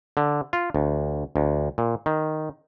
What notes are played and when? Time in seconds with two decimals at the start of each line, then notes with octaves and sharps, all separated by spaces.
0.17 D3
0.53 F4
0.75 D2
1.36 D2
1.78 A#2
2.06 D#3